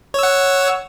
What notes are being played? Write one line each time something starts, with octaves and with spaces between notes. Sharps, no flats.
C#5 F#5 E6